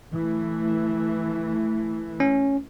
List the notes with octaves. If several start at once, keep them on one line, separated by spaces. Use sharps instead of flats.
E3 A3
C#4